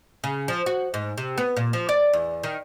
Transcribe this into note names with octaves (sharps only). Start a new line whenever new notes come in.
C#3
F3
F#4
G#2
C3
B3
A#2
F3
D5
E2
D#3